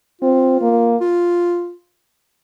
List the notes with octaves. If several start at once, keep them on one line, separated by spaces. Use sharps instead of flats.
C4 F4
A#3
F4